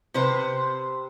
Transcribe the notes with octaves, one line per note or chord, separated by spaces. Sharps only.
C3 B4 C5